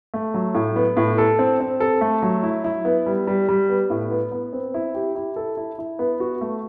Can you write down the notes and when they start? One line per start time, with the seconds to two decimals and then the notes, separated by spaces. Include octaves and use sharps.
0.14 A3
0.34 F#3
0.55 A2
0.76 B3
0.97 A2
1.18 A4
1.39 C4
1.60 C4
1.80 A4
2.01 A3
2.22 F#3
2.43 E4
2.64 E4
2.85 B3
3.06 G3
3.27 G3
3.49 G3
3.69 B3
3.90 A2
4.11 B3
4.32 B3
4.53 C4
4.74 E4
4.95 G4
5.15 E4
5.36 A4
5.57 E4
5.78 E4
5.99 B3
6.20 F#4
6.41 A3